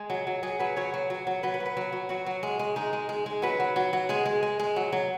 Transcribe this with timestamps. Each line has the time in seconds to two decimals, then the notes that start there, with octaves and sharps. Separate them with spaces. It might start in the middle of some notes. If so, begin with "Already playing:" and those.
Already playing: G#3 G#4
0.10 F#3
0.27 F#3
0.43 F#3 G#4
0.59 F#3 B4
0.77 F#3 C#5
0.94 F#3
1.10 F#3
1.27 F#3
1.43 F#3 B4
1.54 B4
1.60 F#3
1.66 B4
1.77 F#3
1.92 F#3
2.09 F#3 F#4
2.26 F#3
2.43 G#3
2.59 G#3
2.76 G#3 D#4
2.93 G#3
3.09 G#3
3.26 G#3
3.42 F#3 B4
3.60 F#3
3.76 F#3
3.93 F#3
4.09 G#3 G#4
4.26 G#3
4.43 G#3
4.59 G#3
4.76 F#3
4.93 F#3